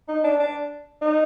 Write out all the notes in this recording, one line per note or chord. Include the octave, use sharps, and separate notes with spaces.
D#4
D4
D4
D#4